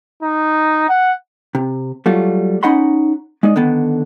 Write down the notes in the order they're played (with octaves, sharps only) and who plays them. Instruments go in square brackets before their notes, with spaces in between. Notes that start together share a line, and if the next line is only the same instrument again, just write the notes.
[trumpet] D#4
F#5
[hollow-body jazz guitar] C3
F#3 G3 A3 F4
C#4 D#4 D#5 F#5 B5 C6
G#3 D#4 D5 D#5
D3 D#3 B3